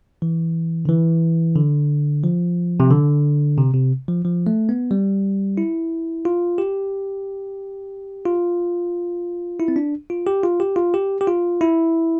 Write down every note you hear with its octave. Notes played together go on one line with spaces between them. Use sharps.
E3
D3
E3
D3
F3
C3
D3
C3
C3
F3
F3
A3
B3
G3
E4
F4
G4
F4
E4
C4
D4
F4
G4
F4
G4
F4
G4
G4
F4
E4